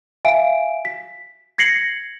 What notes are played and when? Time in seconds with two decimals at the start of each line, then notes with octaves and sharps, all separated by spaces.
0.25 E5 F5 G#5 D7
0.85 B6
1.58 G#6 A#6 C7 C#7 F#7